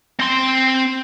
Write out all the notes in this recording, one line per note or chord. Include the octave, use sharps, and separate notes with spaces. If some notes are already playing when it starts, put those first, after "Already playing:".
C4 C6